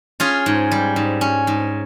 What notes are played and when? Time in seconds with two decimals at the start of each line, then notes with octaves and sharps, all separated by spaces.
0.20 C#4 F4 G#4
0.46 G#2
0.71 G3
0.96 G#2
1.21 C#4
1.47 G#2